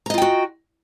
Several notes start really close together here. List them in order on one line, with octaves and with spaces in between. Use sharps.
A#5 D#5 F4 G5 F#4